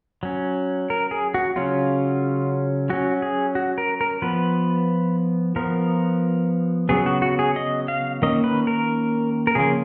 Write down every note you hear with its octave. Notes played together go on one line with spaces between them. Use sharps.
F#3 C#4
A#4
G#4
F#4
C#3 F#3 C#4 F4
F#3 C#4 F#4
G#4
F#4
A#4
A#4
F3 B3 B4
F3 B3 A#4
C#3 F#3 B3 G#4
F#4
F#4
G#4
D#5
F5
D#3 A#3 C#4 D#5
B4
A#4
A#4
C#3 F3 A#3 G#4